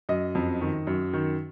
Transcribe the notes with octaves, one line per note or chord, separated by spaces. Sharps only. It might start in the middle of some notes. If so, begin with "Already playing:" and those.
F#2 D#5
F2
D#3
F#2
D#3